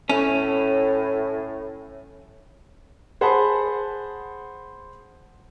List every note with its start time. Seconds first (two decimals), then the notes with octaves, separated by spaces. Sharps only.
0.09 A2 C#4
3.21 G#4 C5 F#5 A5 B5